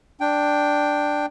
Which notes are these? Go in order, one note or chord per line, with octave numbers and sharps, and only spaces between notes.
D4 G5